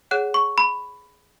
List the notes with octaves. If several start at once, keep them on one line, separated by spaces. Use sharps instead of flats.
G#4 C#5 F#5 F#6
C#6
B5